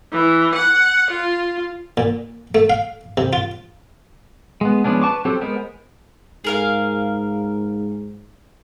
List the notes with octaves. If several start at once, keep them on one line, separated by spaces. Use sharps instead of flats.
E3
F#5
F4
A#2
A3
F5
C3
F4
G#3 B3
F3 G#3 B3 C#4 D4
B4 A5 C#6 D6
F#3 C4 G4 A4 C5
G#3 B3 A#4 C5
G#2 G#4 A#4 F5